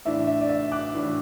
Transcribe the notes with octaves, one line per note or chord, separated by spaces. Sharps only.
A2 E3 D4 E5
E5
D5
E5
D6 F#6
A2 E3 D4